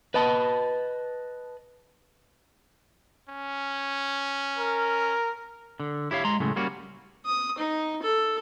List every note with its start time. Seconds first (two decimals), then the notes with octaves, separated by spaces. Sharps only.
0.14 B4 D#5 A5
3.29 C#4
4.58 A#4
5.80 D3
6.11 E4 G4 C#5 F5
6.25 G#3 A#5 C6
6.40 F#2 A2 C#3 G#3 A3
6.56 G3 A#3 C#4 F#4
7.26 D#6
7.58 D#4
8.02 A4